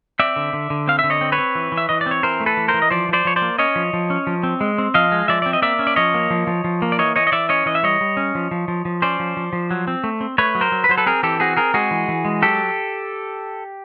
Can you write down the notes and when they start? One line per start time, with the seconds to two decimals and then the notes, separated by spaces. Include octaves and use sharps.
0.19 C4 D5 E5
0.36 D3
0.53 D3
0.70 D3
0.87 C4 F5
0.99 E5
1.04 D3
1.10 C#5 D#5
1.21 C4
1.32 B4 C#5
1.38 C4
1.55 E3
1.72 E3
1.77 E5
1.89 E3 D#5
2.01 D5
2.06 C4
2.11 C#5
2.23 E3 A#4 C5
2.40 A3
2.46 A4 B4
2.57 E3
2.68 A#4 C5
2.74 E3
2.82 D#5
2.90 F3 C5 D5
3.09 F3 C5 D5
3.25 F3 C#5
3.36 C5 D5
3.42 A#3
3.59 C#4 C#5 D#5
3.76 F3
3.93 F3
4.10 C#4
4.27 F3
4.43 C4
4.61 G#3
4.78 C4
4.94 F3 D#5 F5
5.12 G#3
5.28 F3 D5 E5
5.42 C4 D5
5.53 D#5
5.62 A#3 D5 E5
5.79 C#4
5.87 D5
5.96 F3 C#5 D#5
6.14 A#3
6.31 F3
6.47 F3
6.64 F3
6.82 A#3
6.92 D5
6.99 E3 C#5 D#5
7.16 E3 C#5 D#5
7.27 D#5
7.32 E3 D5 E5
7.49 C#4 C#5 D#5
7.66 E3 D#5
7.75 E5
7.83 G3 C#5 D#5
8.01 G3
8.17 C#4
8.35 F3
8.51 F3
8.68 F3
8.85 F3
9.02 C#4 C5 D5
9.20 F3
9.37 F3
9.53 F3
9.71 F#3
9.88 C4
10.04 A3
10.21 C4
10.38 A3 B4 C#5
10.55 F#3
10.61 A#4 C5
10.72 F#3
10.84 B4
10.89 F#3 C5
10.98 A4 B4
11.07 C4 G#4 A#4
11.23 E3 G4 A4
11.40 C4 F#4 G#4
11.56 C4 G#4 A#4
11.74 G#3 F#4 G#4
11.91 E3
12.08 E3
12.25 G#3
12.42 F#3 G4 A4